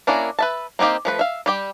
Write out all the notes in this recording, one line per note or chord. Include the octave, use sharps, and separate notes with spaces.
A#3 C#4 D4 E4 A#4
B4 E5 A5
A#3 C4 D#4 G4 F5
F3 A3 B4
E5 F5
G3 G4 G5